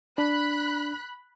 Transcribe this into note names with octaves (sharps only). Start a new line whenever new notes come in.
D4 B5 F#6